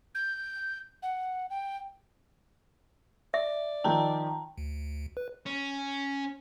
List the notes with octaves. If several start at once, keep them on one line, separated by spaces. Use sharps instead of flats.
G6
F#5
G5
D5 E5
D#3 F3 G5 A5 A#5
D2
B4
C#4